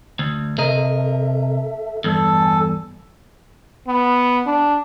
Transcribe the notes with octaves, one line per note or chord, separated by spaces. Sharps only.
D2
C3 A4 A#4 D#5 E5
E2 G2 A4
G#5
B3
D4